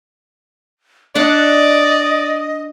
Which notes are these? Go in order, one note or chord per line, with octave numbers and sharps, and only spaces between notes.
D4 D5 D#5 F#5 A5